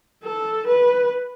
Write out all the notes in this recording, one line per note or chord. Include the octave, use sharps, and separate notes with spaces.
A4
B4